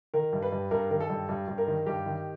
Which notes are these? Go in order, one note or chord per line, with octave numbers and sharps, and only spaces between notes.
D#3 A#4
G2
B4
G2
G2 A#4
D#3 A#4
A4
G2
G2
G2
A#4
D#3
G2 G4
D#3